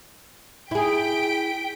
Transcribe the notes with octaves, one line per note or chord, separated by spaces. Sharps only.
E4 G#4 G5 B6 D7